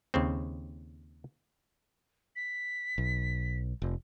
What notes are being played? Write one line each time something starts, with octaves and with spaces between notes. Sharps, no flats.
D#2 C#3 C4
B6
B1
F1